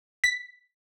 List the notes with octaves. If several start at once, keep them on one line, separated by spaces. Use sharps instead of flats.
B6